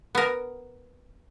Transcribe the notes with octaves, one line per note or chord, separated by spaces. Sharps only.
B3 A#4